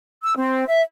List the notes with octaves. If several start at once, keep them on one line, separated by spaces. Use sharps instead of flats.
E6
C4
E5